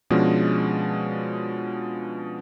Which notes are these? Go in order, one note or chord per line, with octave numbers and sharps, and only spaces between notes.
B2 F3 G#3 C#4 D4